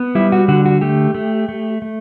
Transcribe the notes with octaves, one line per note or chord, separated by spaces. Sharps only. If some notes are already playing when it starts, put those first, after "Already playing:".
Already playing: B3
G3 E4
F#4
D3 F#4
F#4
A3 G4
A3
A3
A3